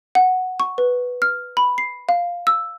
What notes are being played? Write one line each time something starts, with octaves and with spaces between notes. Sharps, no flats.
F#5
C#6
B4
F6
B5
C7
F5
E6